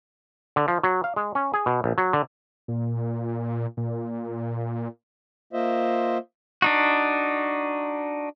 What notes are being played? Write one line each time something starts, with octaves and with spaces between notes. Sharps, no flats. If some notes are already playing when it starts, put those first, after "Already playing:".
D3
F3
F#3
F5
G#3
C#4
G#4
B2
A#1
F#3
D3
A#2
A#2
A#3 F4 C5 D#5 E5
D4 D#4 F#4